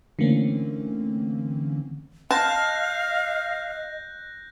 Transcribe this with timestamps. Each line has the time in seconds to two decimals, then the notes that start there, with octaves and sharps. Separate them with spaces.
0.19 D3 E3 A3 A#3 C4 C#4
2.31 D#5 F5 A5 F#6 G6 A#6